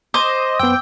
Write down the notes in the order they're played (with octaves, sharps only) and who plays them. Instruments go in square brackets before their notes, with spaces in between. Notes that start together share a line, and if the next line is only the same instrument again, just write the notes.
[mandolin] C5 [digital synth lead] D#5 [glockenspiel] D6
[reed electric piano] F#2 B3 [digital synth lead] G5 [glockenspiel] E6